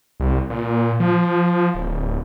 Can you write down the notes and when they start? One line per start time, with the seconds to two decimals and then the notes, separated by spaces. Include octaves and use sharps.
0.20 C2
0.50 A#2
1.00 F3
1.75 D1